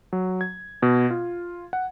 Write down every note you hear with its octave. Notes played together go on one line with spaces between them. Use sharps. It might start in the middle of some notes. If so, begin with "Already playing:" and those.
F#3
G#6
B2
F4
F#5